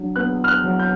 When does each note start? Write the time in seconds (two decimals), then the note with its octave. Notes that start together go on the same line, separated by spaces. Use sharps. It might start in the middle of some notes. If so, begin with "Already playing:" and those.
Already playing: F#3 D4
0.16 B3 F#6
0.44 F6
0.48 F#6
0.64 F#3
0.79 G6